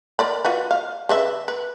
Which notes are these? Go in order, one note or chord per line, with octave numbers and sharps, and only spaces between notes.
A#4 D5 B5
F4 F#4 B4
F5
C#3 B4 E5
B4